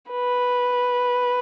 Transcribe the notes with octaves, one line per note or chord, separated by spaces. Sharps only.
B4